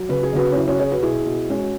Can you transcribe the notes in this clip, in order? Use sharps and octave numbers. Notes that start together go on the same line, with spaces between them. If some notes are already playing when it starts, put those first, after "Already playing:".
Already playing: F#3
C#3 B4
G#4
C#3 F#4 B4
C#4
F#3 E4
C#4 F#4
F#3 G#4 C#5
F#4 B4
B2 E4 G#4
B2
G#3 C#4 F#4